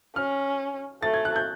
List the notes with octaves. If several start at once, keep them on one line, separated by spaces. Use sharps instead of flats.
C#4 F6
A3 A6
G#6
F#6
G6